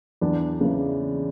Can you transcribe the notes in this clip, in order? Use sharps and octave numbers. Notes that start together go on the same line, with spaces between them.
E2 D4
C#3 E3